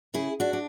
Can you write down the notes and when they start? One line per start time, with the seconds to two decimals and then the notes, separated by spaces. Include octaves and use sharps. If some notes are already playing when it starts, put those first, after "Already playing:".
0.14 C#3 E4 G#4
0.40 D4 F#4
0.53 D4